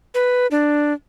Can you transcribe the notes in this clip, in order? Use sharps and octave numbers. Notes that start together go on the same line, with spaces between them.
B4
D4